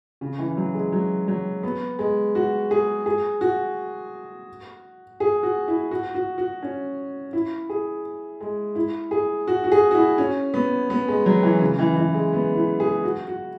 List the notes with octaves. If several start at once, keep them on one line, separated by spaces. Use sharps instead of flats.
C#3
E3
F#3
G#3
F#3
F#3
B3
G#3
F#4
G#4
G#4
F#4
G#4
F#4
E4
F#4
F#4
F#4
C#4
E4
G#4
G#3
E4
G#4
F#4
F#4
G#4
F#4
E4
C#4
B3
B3
G#3
F#3
E3
C#3
E3
E3
G#3
B3
E4
G#4
F#4
F#4